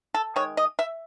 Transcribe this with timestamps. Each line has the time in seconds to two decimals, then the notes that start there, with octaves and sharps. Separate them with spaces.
0.14 A4
0.36 D#3 G#3 C#5
0.57 D#5
0.79 E5